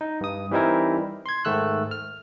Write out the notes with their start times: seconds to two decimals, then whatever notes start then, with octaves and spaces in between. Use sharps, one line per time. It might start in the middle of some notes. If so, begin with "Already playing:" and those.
0.01 D#4
0.21 G2 D#6
0.51 E3 G3 C4 D#4 E4 A#4
1.26 C6 G#6
1.45 G#2 D#3 A3 E6 F#6
1.91 F6